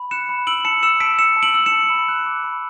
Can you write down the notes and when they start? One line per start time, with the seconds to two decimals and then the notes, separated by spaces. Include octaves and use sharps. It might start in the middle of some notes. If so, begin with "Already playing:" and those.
Already playing: B5
0.11 F#6 C#7 E7
0.29 B5
0.47 E6 D7 F#7
0.65 A5 C#7 E7
0.83 E6 C#7 E7
1.00 A5 B6 D7
1.19 E6 C#7 E7
1.36 A5
1.43 D7 F#7
1.54 E6
1.66 C#7 E7
1.72 A5
1.90 B5
2.08 F#6
2.26 D6
2.44 B5